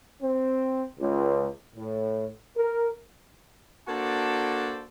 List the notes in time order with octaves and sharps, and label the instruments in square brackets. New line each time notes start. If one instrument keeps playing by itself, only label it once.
[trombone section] C4
C#2
A2
A#4
[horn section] A#3 D4 F#4 A4 C5 A5